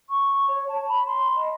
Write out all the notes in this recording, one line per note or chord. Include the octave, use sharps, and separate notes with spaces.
C#6
C#5
A5
B5
C6
D#5